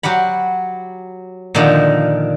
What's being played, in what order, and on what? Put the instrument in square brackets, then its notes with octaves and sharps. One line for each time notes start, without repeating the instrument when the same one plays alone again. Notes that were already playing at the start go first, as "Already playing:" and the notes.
[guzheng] F#3 G4 F#5 B5
A#2 D3 D#3 F3